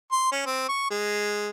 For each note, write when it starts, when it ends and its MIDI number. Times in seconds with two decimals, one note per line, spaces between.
0.12 0.31 84
0.32 0.42 61
0.46 0.66 60
0.69 0.90 85
0.91 1.50 56